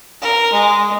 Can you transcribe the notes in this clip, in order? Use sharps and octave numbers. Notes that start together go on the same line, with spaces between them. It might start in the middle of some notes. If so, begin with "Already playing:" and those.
A#4
G#3